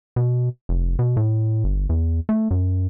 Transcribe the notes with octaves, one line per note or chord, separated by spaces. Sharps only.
B2
F1
B2
A2
G1
E2
A3
F#2